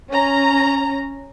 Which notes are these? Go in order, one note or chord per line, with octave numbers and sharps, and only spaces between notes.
C#4 A#5